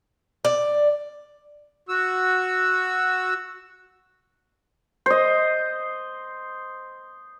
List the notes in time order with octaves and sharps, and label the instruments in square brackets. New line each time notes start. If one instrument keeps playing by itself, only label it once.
[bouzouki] D5
[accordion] F#4 E6
[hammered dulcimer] C5 D#5